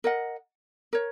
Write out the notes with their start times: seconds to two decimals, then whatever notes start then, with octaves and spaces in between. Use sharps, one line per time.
0.04 A#4 D#5 F#5
0.93 A#4 C#5